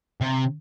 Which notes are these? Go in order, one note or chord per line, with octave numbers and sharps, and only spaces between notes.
C3